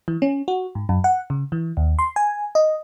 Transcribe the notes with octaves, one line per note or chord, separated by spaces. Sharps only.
E3
C#4
F#4
G#2
F#2
F#5
C#3
E3
D#2
C6
G#5
D#5